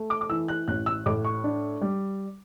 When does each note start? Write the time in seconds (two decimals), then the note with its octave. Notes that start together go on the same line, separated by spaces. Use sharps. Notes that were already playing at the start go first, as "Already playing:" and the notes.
Already playing: A3
0.10 D6
0.21 D6
0.29 E3 E6
0.48 F#6
0.68 A1 F#6
0.86 E6
1.06 A2 D6
1.25 C#6
1.44 D4
1.82 G3